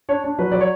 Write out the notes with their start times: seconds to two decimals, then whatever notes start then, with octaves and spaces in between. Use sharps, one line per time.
0.09 D4 C#5
0.24 D4
0.38 F#3 B4
0.51 F#3 D5
0.61 C#5